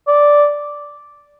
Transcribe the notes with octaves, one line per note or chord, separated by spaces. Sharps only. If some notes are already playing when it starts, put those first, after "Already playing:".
D5